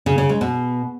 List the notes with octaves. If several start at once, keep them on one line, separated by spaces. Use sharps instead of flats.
C#3
C#3
G#3
B2